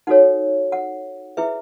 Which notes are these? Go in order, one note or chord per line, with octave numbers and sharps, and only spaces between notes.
D#4 F#4 A4 C#5 F#5
F#5
E4 G#4 B4 E5